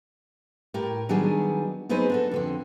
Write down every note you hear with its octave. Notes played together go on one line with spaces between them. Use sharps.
A2 G4 A#4
D#3 F#3 G3 B3 D4 G#4
F#3 B3 D#4 G#4 B4 C5
D4 F#4 A4
F2 D3 C4